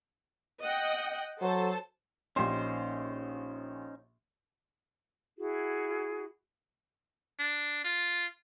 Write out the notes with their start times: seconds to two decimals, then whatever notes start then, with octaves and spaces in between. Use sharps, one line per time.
0.62 D#5 F#5 G5
1.41 F#3 A4 C5 A5
2.36 A#1 C#4 D#4 G4 C5 C6
5.37 E4 F#4 G#4
7.39 D4
7.85 F4